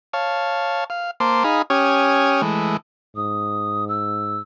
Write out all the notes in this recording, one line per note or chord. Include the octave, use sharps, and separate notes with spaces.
C#5 F5 A5
F5
A#3 C5 A5 C6 D6
D#4 G#4 F5 B5
C#4 G4 C#5 G#5 D#6 F6
E3 G#3 A3
G#2 D#6
E6